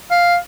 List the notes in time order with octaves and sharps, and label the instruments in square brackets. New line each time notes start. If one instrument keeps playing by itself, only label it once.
[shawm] F5